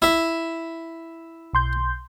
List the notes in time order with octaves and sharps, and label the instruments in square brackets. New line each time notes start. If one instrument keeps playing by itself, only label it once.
[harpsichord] E4 E5
[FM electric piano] B1 C6 G6